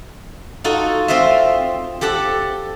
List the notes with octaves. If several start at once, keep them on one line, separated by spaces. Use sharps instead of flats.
D#4 F4 F#4 A4
C4 F4 C5 D#5 E5
G4 A4 F#5 A5